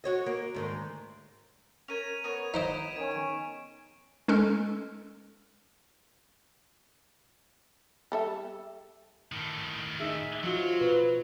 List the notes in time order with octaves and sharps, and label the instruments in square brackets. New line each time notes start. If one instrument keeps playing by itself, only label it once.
[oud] F#4 C#5 D#5
A#3
D2 G#2 D#3
[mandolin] C#4 A#4 [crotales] G#6 D#7 F7
[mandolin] B3 A#4 C#5
[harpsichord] D#4 C5 D#5 [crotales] B6 D7 E7
[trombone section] D#3 C#4 [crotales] G#6 D7
[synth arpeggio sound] G#3 C#4 A4 F6
[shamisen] G3 A4 E5
[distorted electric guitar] A2 D#3
[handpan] D#4 G#4 [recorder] E5
[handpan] F3 F#4 [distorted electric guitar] F#3 [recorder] F4
[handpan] B2 [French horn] B4